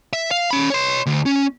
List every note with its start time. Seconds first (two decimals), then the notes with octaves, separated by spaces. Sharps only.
0.13 E5
0.31 F5
0.50 C#4 B5
0.70 C#5 C6
1.06 D2
1.26 C#4